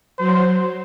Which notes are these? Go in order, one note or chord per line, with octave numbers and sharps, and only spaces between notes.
F#3 C5